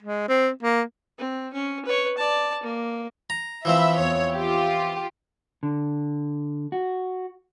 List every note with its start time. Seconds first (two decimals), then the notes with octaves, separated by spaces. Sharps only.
0.03 G#3
0.29 C4
0.63 A#3
1.18 C4
1.53 C#4
1.85 B4 C#5
2.17 D5 A5
2.63 A#3
3.30 A#5
3.65 E3 F3 C4 E5 B5
3.98 E2 C#5
4.33 F4 G4
5.63 D3
6.72 F#4